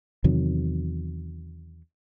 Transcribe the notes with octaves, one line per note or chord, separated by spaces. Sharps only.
E2 C3 D#3 F#3